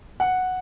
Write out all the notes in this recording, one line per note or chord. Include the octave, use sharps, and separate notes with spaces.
F#5